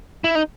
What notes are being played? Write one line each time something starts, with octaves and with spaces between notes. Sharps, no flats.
E4
D#4